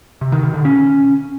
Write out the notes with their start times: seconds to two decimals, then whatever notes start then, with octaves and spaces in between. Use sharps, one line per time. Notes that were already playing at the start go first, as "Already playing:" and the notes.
0.21 C3
0.32 D#3
0.43 B2
0.54 D3
0.65 C#4